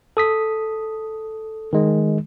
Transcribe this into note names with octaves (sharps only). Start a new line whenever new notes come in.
A4 D#6 B6
D#3 G#3